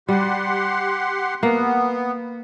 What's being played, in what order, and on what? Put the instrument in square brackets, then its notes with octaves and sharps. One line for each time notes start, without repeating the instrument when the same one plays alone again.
[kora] G3 [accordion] G4 F#5 C6
[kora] A#3 [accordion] B3